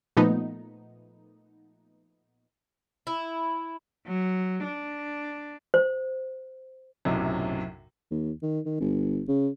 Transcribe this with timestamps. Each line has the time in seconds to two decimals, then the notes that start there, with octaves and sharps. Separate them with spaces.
0.17 A#2 F3 A3 B3 D#4
3.07 E4
4.07 F#3
4.64 D4
5.74 C5
7.05 B1 F#2 A2 C3 F#3
8.11 D#2
8.42 D#3
8.66 D#3
8.80 G1
9.28 C#3